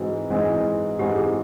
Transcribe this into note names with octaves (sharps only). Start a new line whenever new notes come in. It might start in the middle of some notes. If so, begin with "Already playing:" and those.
Already playing: G#2 E3 G#3 C4 F#4
G#2 E3 G#3 C4
G#2 E3 G#3 C4 G4
G#4